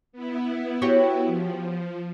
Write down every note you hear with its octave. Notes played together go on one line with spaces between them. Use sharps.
B3 E4
F#4 G4 C#5
F3